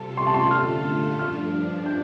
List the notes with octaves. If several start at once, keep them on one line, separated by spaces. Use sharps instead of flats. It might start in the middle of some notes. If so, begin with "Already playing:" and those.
Already playing: C3 G3 F4 A4 A5
C6
A5
C6
D3 A3 F4 A4 F6
G2 F3 D4 F6
G6